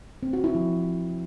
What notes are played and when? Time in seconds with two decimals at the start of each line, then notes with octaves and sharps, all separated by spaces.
0.23 C4
0.33 F#4
0.44 E4
0.55 F3